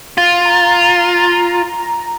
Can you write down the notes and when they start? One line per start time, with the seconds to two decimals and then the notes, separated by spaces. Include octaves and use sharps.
0.18 F4
0.45 A#5